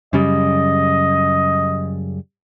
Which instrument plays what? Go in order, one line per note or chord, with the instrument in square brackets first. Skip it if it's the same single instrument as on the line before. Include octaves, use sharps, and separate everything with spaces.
[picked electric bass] F#2 C#3 G3 [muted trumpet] D#5